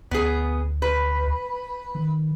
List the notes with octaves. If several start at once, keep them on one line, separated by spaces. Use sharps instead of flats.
D2 B3 G#4
B4
D#3